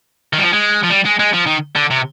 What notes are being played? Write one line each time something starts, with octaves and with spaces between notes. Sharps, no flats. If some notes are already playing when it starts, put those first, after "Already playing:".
D#3
G3
F3
G#3
F3
G3
G#3
G#3
F3
D#3
D3
C3